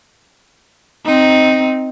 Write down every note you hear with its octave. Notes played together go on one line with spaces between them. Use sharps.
C4 D#4